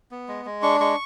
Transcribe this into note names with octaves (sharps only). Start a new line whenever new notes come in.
B3
G#3
G#3
D4 C#6
G#3 C#6